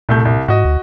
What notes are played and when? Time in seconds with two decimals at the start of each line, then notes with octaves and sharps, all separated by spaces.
0.09 C2 A#2 A3 G6
0.25 C2
0.48 G#2 F#4 D#5
0.65 D2